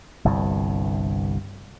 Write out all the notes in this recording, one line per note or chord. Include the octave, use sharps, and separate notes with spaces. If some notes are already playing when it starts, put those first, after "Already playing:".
G1 C2 G2